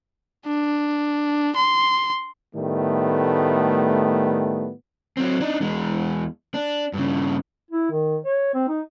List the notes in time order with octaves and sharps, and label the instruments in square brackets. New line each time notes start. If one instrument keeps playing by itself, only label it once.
[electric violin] D4
C6
[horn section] A2 D#3 G3 A3 B3
[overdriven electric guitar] F#3 C4
D4 D#4
E2 G#3
D4
G2 C#3
[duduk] E4
D#3
C#5
C4
D#4